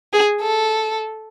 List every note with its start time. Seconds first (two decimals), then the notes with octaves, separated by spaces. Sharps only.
0.13 G#4
0.42 A4